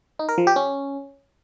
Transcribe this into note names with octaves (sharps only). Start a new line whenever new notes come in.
D#4
A#4
F3
G4
C#4